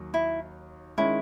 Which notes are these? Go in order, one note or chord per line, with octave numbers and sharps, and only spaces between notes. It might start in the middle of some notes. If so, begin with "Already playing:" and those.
Already playing: D#2 D#3 F#3
E4
D#3 G#3 C#4 E4